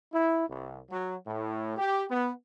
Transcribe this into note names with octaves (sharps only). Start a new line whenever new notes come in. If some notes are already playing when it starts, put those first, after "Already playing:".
E4
C2
F#3
A2
G4
B3